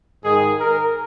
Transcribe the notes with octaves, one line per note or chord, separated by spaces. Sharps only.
G#2 D#3 G#4
A#4